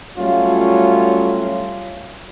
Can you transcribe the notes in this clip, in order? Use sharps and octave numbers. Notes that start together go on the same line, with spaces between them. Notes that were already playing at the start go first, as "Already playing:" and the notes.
F#3 G3 A3 C#4 F4